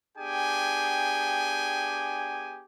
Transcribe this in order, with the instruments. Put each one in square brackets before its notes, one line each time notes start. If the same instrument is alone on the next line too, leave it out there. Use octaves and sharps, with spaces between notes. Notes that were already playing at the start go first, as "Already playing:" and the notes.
[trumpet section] B3 D4 G4 G#4 G5 G#5